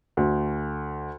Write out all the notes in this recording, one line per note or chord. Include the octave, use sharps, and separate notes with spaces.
D2